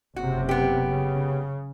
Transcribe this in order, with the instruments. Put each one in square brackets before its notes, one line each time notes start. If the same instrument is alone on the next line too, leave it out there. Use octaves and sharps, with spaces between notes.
[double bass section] F#1 C3 [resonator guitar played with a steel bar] F#4
[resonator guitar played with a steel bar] B3 G4
[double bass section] C#3